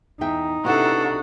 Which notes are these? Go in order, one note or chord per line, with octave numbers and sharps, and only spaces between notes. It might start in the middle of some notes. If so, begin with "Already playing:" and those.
E2 D#4 E5 G5
C3 B3 D4 E4 F#4 A4 F#5